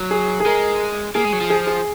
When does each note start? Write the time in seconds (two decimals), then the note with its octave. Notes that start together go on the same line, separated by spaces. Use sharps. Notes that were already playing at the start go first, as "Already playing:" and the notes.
Already playing: F#3
0.11 G#4
0.40 G#4
0.46 G#3 A#4
1.15 A#3 G#4
1.25 G#3
1.33 F#3
1.41 F3
1.50 G#4
1.67 G#4